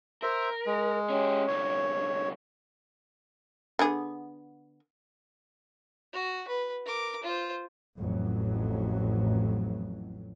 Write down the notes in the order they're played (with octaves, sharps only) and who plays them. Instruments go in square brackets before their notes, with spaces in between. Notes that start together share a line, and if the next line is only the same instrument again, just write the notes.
[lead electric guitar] A#4 [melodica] C5 E5
[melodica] G#3
[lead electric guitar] C#4 G4
[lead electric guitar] C2 D3 [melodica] C#5
[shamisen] D3 B3 G#4
[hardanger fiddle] F#4
B4
A#4 D6
F4 C5
[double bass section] A1 F2 F#3